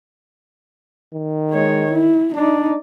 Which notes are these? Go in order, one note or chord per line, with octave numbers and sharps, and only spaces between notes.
D#3
G#3 C#5
E4
D4 D#4 D5